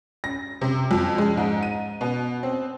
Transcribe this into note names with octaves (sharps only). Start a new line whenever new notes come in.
A#6
C3
F2
G#3
G#2
D#7
B2
C4